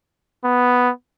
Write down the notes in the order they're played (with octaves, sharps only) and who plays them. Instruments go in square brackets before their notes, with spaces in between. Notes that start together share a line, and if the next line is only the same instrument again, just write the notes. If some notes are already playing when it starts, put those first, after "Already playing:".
[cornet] B3